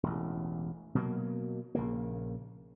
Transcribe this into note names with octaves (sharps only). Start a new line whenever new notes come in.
E1 A1
B2 F#3 A#3
A#1 C#3 A#3